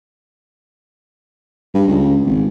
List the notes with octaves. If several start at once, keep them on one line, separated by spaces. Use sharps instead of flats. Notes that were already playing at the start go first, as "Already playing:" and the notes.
G2
C#2
G#1